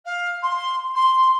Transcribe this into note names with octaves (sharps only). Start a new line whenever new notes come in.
F5
C6
C6